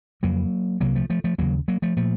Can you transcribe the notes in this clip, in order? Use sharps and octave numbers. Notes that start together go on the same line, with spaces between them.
F2 C#3 F#3 A#3
C2 C3 F#3 A#3
F3 A3
F3 A3
F3 A3
D#2 C#3 F#3 A#3
F#3 A#3
F3 A3
A#2 F3 A3